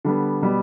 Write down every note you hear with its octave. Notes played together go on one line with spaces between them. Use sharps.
D3 G3 B3
B2 G3 B3